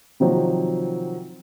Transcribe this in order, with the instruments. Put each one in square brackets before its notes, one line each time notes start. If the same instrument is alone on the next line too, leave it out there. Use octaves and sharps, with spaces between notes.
[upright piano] C3 D#3 F3 F#3